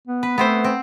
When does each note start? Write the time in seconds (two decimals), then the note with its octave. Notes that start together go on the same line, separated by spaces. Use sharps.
0.08 B3
0.23 B4
0.38 A3 B3 C4 C5
0.64 C4